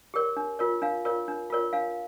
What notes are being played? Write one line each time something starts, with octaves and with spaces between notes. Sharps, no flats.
G4 A#4 C#5
D4
F4 A#4 C#5
D4 F5
F4 A#4 C#5
D4
F4 A#4 C#5
D4 F5